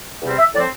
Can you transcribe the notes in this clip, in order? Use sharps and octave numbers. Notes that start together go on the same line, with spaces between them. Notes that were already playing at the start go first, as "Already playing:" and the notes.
E2 C3 G3 C4
E5
A2 F3 C4 D5